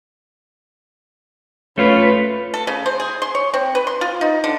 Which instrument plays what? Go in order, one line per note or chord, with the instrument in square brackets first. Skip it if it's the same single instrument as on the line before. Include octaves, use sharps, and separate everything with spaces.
[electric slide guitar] A3 F4 [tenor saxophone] C#4 [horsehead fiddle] B4
[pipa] A4
C#3
C5
G#4
C6
C#5
C4
B4
C6
F4
D#4
D3